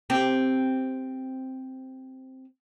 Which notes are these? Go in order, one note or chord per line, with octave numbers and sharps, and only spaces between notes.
C4 G4